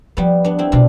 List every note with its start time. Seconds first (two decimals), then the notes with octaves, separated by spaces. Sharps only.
0.17 F3 G3 B3
0.45 B3 D4
0.59 C4 E4
0.72 B2 D4 F4